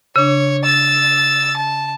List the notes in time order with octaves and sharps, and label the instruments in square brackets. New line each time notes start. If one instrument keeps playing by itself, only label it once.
[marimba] C#3 D4 [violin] C#5
[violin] E6 A6
A5